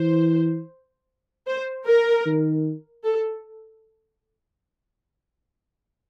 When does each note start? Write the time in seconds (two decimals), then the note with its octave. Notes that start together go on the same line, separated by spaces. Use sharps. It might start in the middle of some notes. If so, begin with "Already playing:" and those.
Already playing: E3 C5
1.47 C5
1.87 A#4
2.26 D#3
3.04 A4